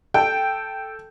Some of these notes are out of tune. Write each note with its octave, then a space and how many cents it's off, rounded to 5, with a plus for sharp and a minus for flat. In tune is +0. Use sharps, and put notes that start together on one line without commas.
A4 +0 G5 +0